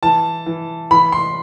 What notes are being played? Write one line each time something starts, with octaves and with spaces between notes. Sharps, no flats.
E3 A5
E3
E3 B5
C6